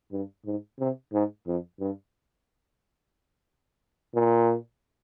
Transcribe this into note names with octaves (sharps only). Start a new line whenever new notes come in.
G2
G#2
C3
G#2
F2
G2
A#2